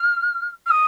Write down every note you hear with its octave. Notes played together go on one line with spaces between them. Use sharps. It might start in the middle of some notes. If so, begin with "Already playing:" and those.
Already playing: F6
F6
D#6